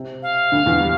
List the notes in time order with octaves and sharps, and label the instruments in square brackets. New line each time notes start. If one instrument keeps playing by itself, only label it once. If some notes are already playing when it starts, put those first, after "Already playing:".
Already playing: [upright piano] C3
[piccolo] F5
[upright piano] D2 D3
E2 E3
G3